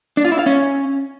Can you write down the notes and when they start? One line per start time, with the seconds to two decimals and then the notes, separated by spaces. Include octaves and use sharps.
0.17 D4
0.25 F4
0.32 E4
0.39 F5
0.46 C#4